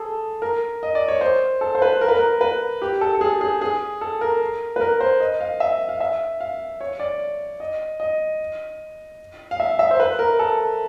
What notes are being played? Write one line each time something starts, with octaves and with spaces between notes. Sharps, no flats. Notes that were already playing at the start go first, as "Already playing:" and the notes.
Already playing: G#4 A4
A#4
D#5
D5
C#5
C5
A4
C5
B4
A#4
B4
A#4
B4
G4
A4
A4
G#4
G#4
G#4
A4
A#4
B4
A#4
C5
D#5
F5
E5
F5
E5
F5
C#5
D5
D#5
D#5
F5
E5
E5
C5
B4
A#4
A4